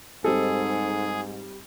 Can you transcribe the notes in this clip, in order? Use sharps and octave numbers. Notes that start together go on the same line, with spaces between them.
G#2 G3 C4 D#4 G#4 A4